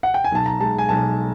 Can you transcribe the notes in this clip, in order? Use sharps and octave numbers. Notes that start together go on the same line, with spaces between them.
F#5
G5
G#5
B1 A5
A#5
G#3 A5
G#5
B1 A5